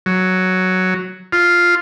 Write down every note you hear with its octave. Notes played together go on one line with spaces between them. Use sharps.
F#3
F4